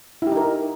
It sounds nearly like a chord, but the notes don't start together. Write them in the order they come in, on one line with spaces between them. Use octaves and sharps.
E4 G4 D#4 A#4